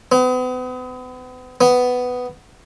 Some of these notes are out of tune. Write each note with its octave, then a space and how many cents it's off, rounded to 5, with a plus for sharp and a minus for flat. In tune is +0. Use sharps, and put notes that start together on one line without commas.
B3 +40
B3 +10